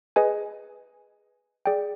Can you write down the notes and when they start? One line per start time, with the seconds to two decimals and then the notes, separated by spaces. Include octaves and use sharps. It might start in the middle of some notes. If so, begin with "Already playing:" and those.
0.16 G#4 B4 D#5 G#5
1.66 G#4 D5 G5